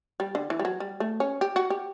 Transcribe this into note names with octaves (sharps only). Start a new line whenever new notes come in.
G3
D3
E3
G3
F#3
G3
A3
C#4
G4
F#4
G4